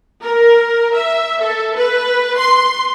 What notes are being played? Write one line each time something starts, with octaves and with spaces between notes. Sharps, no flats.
A#4
E5
A4
B4
C6